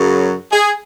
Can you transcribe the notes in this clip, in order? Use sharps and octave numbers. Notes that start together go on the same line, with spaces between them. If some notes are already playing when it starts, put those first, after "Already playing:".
Already playing: F#2 C#3 F#3
G#4